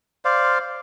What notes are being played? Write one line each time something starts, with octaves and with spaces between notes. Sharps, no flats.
C5 D5 F5